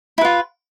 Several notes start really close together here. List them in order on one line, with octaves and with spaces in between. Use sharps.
E4 B4 F4